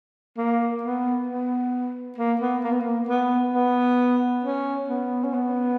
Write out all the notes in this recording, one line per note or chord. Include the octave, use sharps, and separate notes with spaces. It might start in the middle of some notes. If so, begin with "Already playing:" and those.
A#3
B3
B3
A#3
B3
A#3
B3
A#3
B3
B3
C#4
B3
C#4
B3